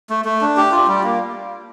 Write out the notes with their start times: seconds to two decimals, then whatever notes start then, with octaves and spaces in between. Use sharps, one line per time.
0.10 A3
0.25 A3
0.41 D4
0.57 G4
0.71 F4
0.87 G3
1.04 A#3